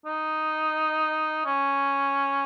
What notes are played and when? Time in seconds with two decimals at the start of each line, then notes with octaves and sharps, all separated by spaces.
0.06 D#4
1.46 C#4